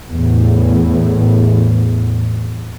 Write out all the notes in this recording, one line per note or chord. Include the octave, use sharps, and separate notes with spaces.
E2 A2